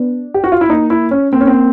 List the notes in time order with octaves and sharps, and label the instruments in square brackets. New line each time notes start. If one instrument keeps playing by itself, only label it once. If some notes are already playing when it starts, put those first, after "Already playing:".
Already playing: [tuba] B3 [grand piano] D4
[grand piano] G4
F#4
F4
E4
[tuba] A#3 [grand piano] D#4
[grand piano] E4
C#4
[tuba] A#3 [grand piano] C4
[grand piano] C#4
C4